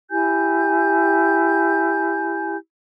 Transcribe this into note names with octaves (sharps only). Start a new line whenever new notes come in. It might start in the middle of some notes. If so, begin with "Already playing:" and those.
E4 G4 G#5 G6